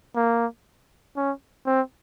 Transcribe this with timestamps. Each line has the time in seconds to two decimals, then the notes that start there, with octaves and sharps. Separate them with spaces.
0.16 A#3
1.17 C#4
1.66 C4